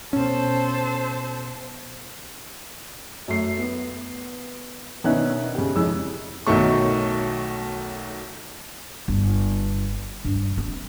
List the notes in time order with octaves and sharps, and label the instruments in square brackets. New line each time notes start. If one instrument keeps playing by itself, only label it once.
[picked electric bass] B2 C#4 [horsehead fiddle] A4 C5
[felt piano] F#2 A3 C7
B3
B2 D#3 C#4 D4 E5 F#6
C#3 G4
F2 G#3 C#4 E4 E6
[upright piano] B1 D#3 F#3 A3 C#6
[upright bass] G1
G2
C4